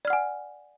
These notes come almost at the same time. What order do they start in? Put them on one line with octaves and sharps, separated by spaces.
D5 F6 F#5 G#5